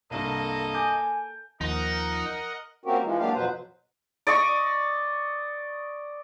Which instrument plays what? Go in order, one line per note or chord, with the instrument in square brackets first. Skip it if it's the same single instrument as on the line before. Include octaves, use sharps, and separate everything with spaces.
[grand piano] C2 G2 [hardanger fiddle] A#3 A4 [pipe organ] D#5
[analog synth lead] G#5 [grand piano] D6 G6
[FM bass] D#2 [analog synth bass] F3 [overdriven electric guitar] D#4 [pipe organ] A#4 D#5 F#5
[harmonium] A#3 C4 C#4 F#4 G4 A#4
E3 F3 G#3
F#3 A#3 D4 G4 F5
F2 B2 F#3 B4 C5
[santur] D5 D#5 C#6